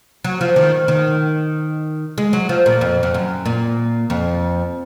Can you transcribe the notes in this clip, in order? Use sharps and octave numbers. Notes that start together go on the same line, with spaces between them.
F#3
F3
D#3
D#3
G#3
F#3
F3
A#2
F2
F2
F#2
A#2
F2